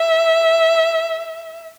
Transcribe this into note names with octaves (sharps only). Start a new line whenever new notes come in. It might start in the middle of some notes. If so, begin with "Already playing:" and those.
Already playing: E5